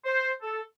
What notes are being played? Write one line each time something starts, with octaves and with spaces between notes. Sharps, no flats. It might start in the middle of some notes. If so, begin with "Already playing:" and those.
C5
A4